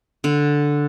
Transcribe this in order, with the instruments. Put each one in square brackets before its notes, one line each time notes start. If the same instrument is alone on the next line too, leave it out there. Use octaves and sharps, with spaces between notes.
[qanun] D3